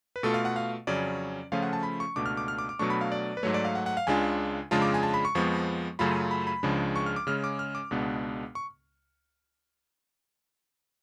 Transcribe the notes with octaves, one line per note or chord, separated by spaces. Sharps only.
B4
B2 A3 F4 A4
F5
F#5
F5
F2 C#3 F#3 C#4 D5
C#3 F3 A3 C#4 F4 F5
F#5
A5
B5
C#6
C#2 B2 A3 D4 D6
F6
D6
F6
D6
D6
B2 F#3 A3 D4 C#6
B5
F5
D5
B4
G#2 F#3 A3 C#5
D5
F5
F#5
F#5
F5
C#2 C#3 G#3 D4 F4 G#5
F2 C#3 G#3 D4 F4 A5
D6
G#5
A5
B5
C#6
F2 F3 G#3 B3
F#2 C#3 F#3 A3 F4 B5
B5
B5
C#2 C#3 F3 G#3 D4
C#6
F6
D6
C#3 G#3 C#4 F6
D6
F6
D6
C#2 B2 G#3 B3 D4
C#6